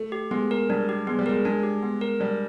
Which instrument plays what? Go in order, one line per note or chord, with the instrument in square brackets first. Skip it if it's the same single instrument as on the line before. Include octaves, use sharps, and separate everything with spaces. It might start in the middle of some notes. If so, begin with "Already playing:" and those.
Already playing: [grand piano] A3
[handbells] G4
[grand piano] G#3 [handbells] B3
[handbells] A#4
[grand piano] G3 [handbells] D4
[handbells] G4
[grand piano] G#3 [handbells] B3
[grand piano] G3
[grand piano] G#3 [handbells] A#4
[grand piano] G#3 [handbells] D4
[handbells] G4
B3
A#4
[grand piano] G3 [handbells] D4